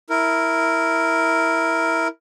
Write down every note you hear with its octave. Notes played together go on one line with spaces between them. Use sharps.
E4 A#4